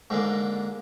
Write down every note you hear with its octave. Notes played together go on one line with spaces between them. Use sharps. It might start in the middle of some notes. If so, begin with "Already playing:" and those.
G#2 D3 A#3